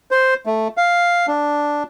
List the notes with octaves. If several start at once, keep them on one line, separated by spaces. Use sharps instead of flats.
C5
A3
F5
D4